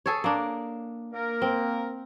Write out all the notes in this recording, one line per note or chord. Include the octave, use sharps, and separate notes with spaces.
G#4 A4 C#5
A#3 D4
A#3 A#4
C4